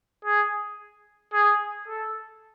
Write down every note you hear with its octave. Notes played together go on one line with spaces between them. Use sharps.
G#4
G#4
A4